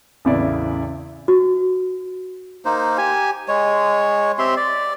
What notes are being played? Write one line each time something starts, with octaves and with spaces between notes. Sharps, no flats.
A1 E2 C#3 E4 D5
F#4
A#3 D#4 C5
G4 G#5
G#3 C#5
C4 G4 E5 C6
D5